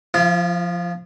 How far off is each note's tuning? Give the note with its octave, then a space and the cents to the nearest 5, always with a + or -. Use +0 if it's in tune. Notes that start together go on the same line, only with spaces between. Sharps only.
F3 +0 F4 -40